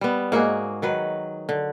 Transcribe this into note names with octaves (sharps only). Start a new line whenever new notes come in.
G3 B3
G#2 A#3 F#4 G#4
D#3 F#3 B4
D3